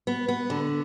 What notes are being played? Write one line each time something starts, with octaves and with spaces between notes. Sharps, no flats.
B3
B3
D3